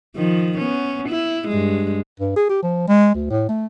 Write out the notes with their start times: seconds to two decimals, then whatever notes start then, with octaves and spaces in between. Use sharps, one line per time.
0.16 D#3 F3
0.58 B3 C#4
1.09 E4
1.49 G2 G#3
2.19 G2
2.36 G#4
2.49 G4
2.63 F3
2.88 G#3
3.14 D2
3.30 A2
3.49 A3